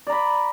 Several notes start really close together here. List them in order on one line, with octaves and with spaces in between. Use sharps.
D5 A#5 B5